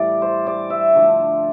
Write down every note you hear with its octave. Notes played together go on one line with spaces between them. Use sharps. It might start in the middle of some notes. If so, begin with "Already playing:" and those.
Already playing: A2 E3 G3 D5
C5
D5
E5
D3 F3 A3